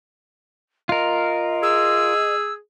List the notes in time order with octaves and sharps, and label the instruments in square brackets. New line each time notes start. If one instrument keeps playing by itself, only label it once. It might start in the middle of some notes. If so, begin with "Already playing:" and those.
[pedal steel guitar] F4 A#4 [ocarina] D#5
[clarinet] G#4 [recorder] E6